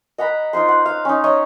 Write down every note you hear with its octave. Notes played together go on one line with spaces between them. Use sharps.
D#5 F#5 A#5 B5
D#4 F4 C5 C6
F#5
F5
C#4 D#4
C#5 D#5 C#6